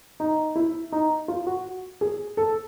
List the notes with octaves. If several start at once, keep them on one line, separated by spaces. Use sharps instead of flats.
D#4
E4
D#4
F4
F#4
G#4
A4